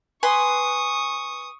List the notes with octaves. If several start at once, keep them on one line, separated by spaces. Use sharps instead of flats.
B4 G#5 C6 C#6 D#6